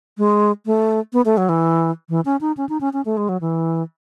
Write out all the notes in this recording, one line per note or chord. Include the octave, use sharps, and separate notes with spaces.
G#3
A3
B3
A3
F#3
E3
E3
C#4
D#4
C#4
D#4
C#4
C#4
A3
G#3
F#3
E3